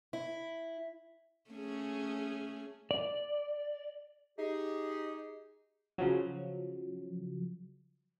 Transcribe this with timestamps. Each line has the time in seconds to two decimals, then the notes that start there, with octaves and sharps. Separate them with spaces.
0.13 E4
1.51 A3 C#4 G#4
2.91 D5
4.38 D#4 G4 G#4
5.98 C#3 F3 F#3